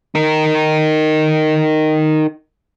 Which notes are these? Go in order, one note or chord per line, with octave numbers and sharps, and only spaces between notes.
D#4 A#4